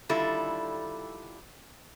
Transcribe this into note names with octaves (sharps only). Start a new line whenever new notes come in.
D3 D#3 G3 E4 F4 A4